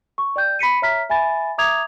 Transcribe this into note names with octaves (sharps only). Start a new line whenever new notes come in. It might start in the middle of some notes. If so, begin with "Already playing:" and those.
C#6
D5 G5 G6
B5 B6 C#7 D#7
C#5 E5 A#5 F6 B6
E5 G#5 B5 A6
E5 A#5 D6 D#6 G#6 F7